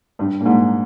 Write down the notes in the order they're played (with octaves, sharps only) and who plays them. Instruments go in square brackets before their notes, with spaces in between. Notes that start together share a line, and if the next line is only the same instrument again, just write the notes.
[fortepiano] G2
A#2
G#2